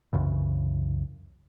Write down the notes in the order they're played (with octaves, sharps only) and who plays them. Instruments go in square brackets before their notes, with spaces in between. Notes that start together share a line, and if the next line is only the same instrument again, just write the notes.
[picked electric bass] C2 F#2 C#3 E3